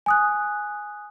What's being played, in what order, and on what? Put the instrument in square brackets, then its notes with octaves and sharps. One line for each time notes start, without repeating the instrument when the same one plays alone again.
[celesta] G#5 D#6 F#6